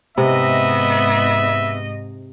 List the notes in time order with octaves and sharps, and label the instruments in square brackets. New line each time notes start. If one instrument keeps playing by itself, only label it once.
[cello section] G#2 D#5 [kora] C3 [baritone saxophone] B3 [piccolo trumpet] E5